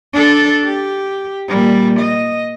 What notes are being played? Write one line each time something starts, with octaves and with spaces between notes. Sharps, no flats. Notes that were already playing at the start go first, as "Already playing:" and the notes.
D4 A4
G4
A#2 G3
D#5